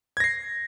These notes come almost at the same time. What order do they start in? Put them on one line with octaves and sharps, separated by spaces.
G#6 A#6 C7